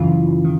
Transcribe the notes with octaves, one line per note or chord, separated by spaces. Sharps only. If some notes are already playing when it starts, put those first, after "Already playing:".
Already playing: F#2 C#3 E3 F4
D#3